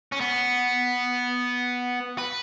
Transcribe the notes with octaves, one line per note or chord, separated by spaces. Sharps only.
C#4
B3
B4